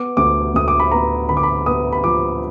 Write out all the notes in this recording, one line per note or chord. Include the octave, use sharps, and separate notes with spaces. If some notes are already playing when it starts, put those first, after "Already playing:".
Already playing: B3 D6
D2 D6
D2 D#6
D6
B5
B3 A#5
D3 B5
D6
B5
B3 D#6
B5
F3 D6